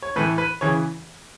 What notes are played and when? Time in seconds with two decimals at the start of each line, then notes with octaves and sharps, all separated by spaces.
0.02 C#5
0.16 A2 E3 A3 B4
0.38 B4
0.61 C#3 E3 C#5